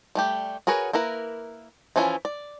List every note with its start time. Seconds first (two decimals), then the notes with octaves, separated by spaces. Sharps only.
0.15 G3 A3 G4
0.67 F#4 G#4 A#4 B4 C#5
0.93 A#3 E4 A#4 B4
1.96 E3 F3 C#4 E4 F4
2.25 D5